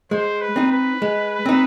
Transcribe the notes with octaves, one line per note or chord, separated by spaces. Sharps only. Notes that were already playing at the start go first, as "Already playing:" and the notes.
G#3 C5
B4
C4 D#4
B4
G#3
C4 D#4